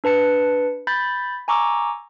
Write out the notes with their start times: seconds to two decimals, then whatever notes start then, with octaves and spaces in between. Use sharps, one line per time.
0.04 D4 B4 A5 C#7
0.87 B5 G6 A6 B6
1.48 G#5 A#5 C#6 D6 E6